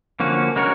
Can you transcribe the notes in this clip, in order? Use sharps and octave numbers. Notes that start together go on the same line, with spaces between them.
D3 F3 A#3 C#4 F#4
G#3 C#4 F#4 A#4 C#5